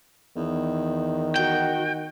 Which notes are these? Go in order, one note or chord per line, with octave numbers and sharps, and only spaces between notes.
E2 D#3
F#4 G5